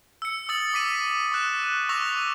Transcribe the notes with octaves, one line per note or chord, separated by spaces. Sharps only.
E6 C#7
D#6 E6 A6 F#7
D6 B6 D#7 F#7
C#6 E6 F#6 E7
C#6 D6 E6 A#6 F7